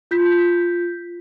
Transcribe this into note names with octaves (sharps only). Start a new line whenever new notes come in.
F4 G6 B6